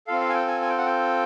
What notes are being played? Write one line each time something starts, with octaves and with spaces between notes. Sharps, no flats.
C4 F4 A4 F5
F5
G#5
G5
G#5
G#5
G5
F#5
G5